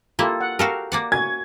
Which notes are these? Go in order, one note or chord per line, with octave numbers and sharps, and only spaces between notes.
A#3 E4 F4 G4 A4
F#5
F#4 G4 A4 A#4 F5
A#3 D5 F#5
F#4 G#5 G#6